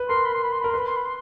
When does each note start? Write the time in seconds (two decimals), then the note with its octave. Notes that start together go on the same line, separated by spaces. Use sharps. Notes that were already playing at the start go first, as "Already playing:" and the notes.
Already playing: B4
0.09 A#4 C6
0.25 B5
0.34 C6
0.43 B5
0.52 C6
0.60 A#4 B5
0.70 B4 C6
0.79 B5
0.87 C6
0.96 B5
1.05 C6